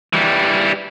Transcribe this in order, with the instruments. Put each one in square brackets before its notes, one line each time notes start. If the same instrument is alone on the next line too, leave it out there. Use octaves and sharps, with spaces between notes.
[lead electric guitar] E3 G3